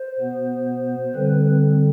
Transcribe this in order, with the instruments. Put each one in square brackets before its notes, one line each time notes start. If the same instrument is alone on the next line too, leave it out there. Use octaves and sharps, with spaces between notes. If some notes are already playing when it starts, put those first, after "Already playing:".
Already playing: [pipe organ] C5
B2 B3
D3 G3 C4 B4